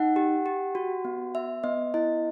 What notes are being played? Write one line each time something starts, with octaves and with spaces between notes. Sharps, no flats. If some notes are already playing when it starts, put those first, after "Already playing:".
Already playing: D#4 F#5
G4
G4
F#4
B3
B3 E5
B3 D#5
E4 D#5